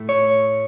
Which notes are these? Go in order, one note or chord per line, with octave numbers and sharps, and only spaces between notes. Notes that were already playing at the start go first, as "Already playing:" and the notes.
Already playing: A2 A3
C#5